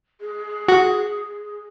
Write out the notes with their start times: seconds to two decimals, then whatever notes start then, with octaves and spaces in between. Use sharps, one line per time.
0.21 G#4
0.68 F#4